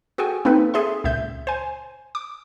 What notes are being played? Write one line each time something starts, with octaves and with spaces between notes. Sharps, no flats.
F#4 G#4 A4 G5 G#5
A#3 C4 D#4 A4 B4
G#4 A4 E5 C6
C#2 A#2 E5 G6
C5 G#5
D6